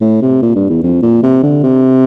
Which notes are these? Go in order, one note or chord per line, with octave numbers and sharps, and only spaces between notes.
A2
C3
A#2
G2
E2
F2
A#2
C3
D3
C3